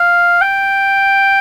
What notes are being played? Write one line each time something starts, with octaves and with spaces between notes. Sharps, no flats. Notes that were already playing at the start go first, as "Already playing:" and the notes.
Already playing: F5
G5